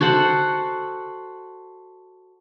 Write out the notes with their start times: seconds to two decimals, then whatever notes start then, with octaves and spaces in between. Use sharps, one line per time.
0.01 F#4 A4 C5 F#5